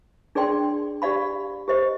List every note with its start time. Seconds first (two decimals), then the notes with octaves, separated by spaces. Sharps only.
0.35 D4 G#4 D5 G5 C6
1.02 G4 D5 F5 B5
1.68 G4 C5 D#5